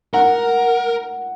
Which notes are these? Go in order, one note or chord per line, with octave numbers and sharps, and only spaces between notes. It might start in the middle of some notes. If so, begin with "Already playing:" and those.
A#4 F#5